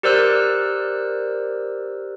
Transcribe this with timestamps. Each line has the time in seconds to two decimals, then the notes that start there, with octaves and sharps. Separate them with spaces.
0.03 G4 A#4 C5 D5 E6 F#6